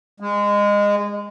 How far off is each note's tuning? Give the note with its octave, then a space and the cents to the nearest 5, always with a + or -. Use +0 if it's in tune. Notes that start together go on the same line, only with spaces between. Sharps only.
G#3 -20